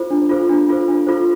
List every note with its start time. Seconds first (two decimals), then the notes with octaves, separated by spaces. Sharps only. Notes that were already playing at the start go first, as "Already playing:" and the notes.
Already playing: F4 A4 C5
0.11 D4
0.29 F4 A4 C5
0.49 D4
0.69 F4 A4 C5
0.88 D4
1.07 F4 A4 C5